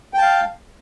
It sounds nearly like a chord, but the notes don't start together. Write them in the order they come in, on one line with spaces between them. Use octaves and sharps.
G5 A5 F5